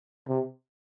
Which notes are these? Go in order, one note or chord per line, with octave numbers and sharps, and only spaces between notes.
C3